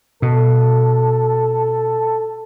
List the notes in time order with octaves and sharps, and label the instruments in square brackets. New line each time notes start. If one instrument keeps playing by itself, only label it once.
[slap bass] B2 [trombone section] A4